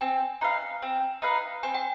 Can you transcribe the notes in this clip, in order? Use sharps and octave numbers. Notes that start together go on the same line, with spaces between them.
C4 G#5
D#4 B4 F5
C4
D#4 B4 F5
C4 G#5
G5